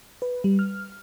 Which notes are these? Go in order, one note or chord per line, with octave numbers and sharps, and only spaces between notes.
B4
G3
F6